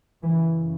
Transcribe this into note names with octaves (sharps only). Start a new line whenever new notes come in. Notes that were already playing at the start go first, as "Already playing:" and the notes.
F#2 C#3 E3